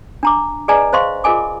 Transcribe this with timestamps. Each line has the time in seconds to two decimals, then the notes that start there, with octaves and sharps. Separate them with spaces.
0.23 D4 A#5 D6
0.68 G#4 B4 D5 D#5 G#5 A#5
0.93 C5 D#5 F5 C6 C#6
1.24 F4 G#4 A#4 D#5 G#5 D6